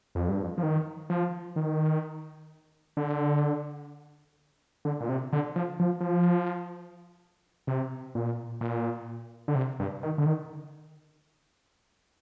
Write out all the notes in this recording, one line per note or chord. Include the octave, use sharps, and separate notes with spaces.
F2
G2
F2
F3
D#3
F3
D#3
D3
D3
A#2
C3
D3
F3
F3
F3
C3
A#2
A#2
D3
C3
G2
D#3
D3
D#3